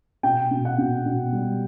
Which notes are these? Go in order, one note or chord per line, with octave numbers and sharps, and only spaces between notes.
B2 G5
B2
F#5
B2
B2
G3